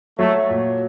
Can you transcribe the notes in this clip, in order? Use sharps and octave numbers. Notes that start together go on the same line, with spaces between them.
F#3 A3
A#2